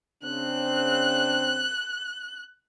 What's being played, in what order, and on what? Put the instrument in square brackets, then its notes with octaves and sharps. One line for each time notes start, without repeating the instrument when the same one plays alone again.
[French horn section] C#3 C4 D4 [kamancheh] F#6